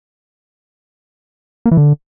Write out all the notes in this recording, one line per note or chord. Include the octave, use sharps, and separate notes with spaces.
A#3
E3
D3